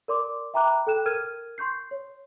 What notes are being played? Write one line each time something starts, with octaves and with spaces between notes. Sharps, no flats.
A#4 D5 C6 D6
E5 G5 A#5 B5 D6 F#6
A4 G5 F#6 E7
A#4 F6 G#6 D#7
C6 C#6 G6 C7
C#5